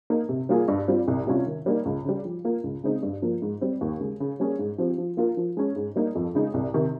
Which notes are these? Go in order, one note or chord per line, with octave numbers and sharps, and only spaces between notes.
A#3 D#4
C3
G3 A#3 F4 G#4
G2
G3 C4 F4
C2
C3 G3 C#4 F4
D#3
G3 A#3 D#4
C#2
C#3 G3
F3
A#3 F4
C#2
C#3 G#3 C4 D#4
G2
F3 A#3
G#2
G3 C4
D#2
C#3 G#3
C#3
G3 A#3 C#4 G#4
G#2
F3 C4 G4
F3
A#3 F4 A#4
F3
G#3 C#4
G#2
G3 A#3 D#4
F2
C#3 G#3 D#4
C2
C3 D#3